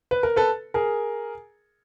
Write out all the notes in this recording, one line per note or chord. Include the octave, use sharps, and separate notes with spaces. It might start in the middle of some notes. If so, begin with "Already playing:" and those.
B4
A#4
A4 B4
G#4 A#4